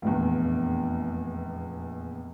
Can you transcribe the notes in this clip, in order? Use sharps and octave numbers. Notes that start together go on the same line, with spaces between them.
F1 A#1 E2